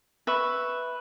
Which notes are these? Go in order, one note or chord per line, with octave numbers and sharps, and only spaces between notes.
B4 E5 C#6